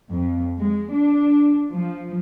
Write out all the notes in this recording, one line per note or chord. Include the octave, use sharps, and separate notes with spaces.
F2
G#3
D4
F3